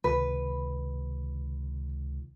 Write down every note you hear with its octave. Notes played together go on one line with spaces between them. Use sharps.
C#2 C3 D#3 B4